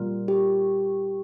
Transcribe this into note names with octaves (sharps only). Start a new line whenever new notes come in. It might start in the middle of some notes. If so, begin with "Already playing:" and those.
Already playing: A#2 G3 A#3 F4 A#4
G4